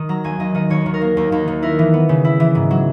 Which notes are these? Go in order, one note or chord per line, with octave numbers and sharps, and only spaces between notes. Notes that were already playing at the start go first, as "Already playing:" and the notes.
Already playing: D#3 D#6
F#3 A#5
D#2 G#5
D#2 D#5
D#3 D#5
D#2 C#5
D#3
A#4
A#3
D#2
D#2
D#3
E4 A#4
E3
B3
C#3
E4
E3
G#2
F#3